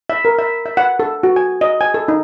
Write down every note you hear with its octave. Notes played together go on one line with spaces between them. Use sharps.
E5
A#4
E5
E5
F#5
A4
F#4
G#5
D#5
G#5
A4
D#4